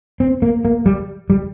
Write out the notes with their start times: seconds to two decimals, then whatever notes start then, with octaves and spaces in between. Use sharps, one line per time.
0.20 C4
0.42 A#3
0.65 A#3
0.86 G3
1.30 G3